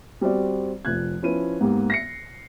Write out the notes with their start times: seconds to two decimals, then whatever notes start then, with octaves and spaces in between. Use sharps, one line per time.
0.21 G3 C4 F#4 D5
0.85 F1 F3 F#6 G#6
1.22 F3 C#4 E4 B4 D#7
1.61 G#2 A#3 B3 G4
1.90 A#6 C7 C#7